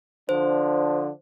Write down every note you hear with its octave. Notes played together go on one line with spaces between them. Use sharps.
D3 F3 D4 C5